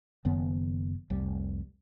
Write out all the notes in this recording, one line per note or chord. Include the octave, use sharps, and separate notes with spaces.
F#1 F#2 D#3 B3
F1 C2 G3